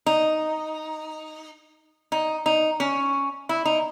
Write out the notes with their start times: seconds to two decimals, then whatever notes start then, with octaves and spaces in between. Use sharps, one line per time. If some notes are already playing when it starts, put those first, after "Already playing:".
0.06 D#4
2.12 D#4
2.46 D#4
2.80 C#4
3.49 E4
3.65 D#4